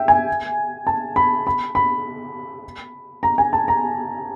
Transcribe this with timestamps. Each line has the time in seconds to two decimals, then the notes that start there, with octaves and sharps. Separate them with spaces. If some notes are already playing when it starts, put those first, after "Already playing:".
Already playing: E5 G5
0.08 G#5
0.87 A5
1.16 B5
1.47 B5
1.75 B5
3.23 A#5
3.38 G#5
3.53 A5
3.68 A#5